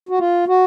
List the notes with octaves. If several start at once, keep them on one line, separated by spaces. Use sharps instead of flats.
F#4
F4
F#4